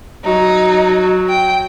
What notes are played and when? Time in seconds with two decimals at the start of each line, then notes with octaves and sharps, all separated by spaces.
0.24 F#3 D#4
1.29 G5